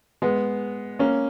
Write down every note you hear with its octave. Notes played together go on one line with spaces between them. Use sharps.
G#3 B3
A#3 C#4